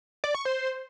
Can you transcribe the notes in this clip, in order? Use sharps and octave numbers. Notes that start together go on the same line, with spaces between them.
D5
C#6
C5